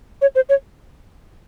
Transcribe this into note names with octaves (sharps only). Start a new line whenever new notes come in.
C#5
C5
C#5